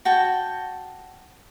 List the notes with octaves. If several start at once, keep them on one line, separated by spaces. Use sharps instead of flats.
F#4 G5 A5